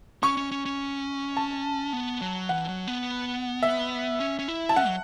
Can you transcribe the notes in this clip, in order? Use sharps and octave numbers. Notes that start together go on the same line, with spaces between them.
C#4 C#6
C#4
C#4
C#4
A5
B3
F#3
E3 F#5
F#3
B3
E5
C#4
C#4
E4
A5
C#4 F#5
F#3